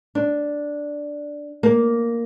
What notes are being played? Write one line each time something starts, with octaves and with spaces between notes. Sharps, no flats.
D4
A#3